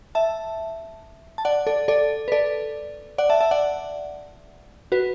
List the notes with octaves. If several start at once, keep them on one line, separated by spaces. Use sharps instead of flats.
E5 A5
A5
D5 F#5
A4 D5
A4 D5
B4
A4 D5
D5 F#5
E5 A5
E5 A5
D5 F#5
F#4 B4